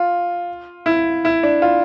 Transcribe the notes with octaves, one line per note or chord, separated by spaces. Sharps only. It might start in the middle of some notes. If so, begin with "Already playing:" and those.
Already playing: F4
E4
E4
D4
F4